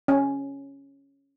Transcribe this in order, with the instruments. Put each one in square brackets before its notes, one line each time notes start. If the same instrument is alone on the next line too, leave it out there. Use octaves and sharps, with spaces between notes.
[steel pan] C#4